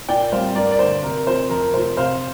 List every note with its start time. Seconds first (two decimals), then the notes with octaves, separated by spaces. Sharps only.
0.09 A#2 D5 G5
0.32 G3 C4 C5 F5
0.55 G2 A#4 D5
0.71 D5
0.79 D3 A#3 C5
1.03 C3 A#4
1.26 F3 C4 C5
1.50 F2 A#4
1.73 C3 F3 C5
1.97 C3 C5 F5